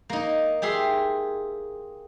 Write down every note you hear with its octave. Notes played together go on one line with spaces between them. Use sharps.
A#3 D#4
G4 G#4 E5 C6